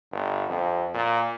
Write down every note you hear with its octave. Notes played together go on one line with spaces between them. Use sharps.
G1
F2
A#2